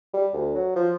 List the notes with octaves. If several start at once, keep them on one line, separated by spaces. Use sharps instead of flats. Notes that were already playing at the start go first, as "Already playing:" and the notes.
G3
D2
F#3
F3